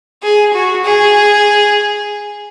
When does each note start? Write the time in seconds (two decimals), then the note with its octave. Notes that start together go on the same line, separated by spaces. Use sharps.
0.23 G#4
0.54 F#4
0.84 G#4